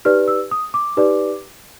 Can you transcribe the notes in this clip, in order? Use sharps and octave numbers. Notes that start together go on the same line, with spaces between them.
D#4 G4 B4 D5 F6
E6
D#6
D6
D#4 G4 B4 D5